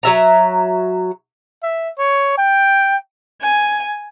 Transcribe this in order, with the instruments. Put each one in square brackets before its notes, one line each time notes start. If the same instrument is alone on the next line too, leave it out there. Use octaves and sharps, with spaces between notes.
[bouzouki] F#3 E5 A#5
[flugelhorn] E5
C#5
G5
[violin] G#5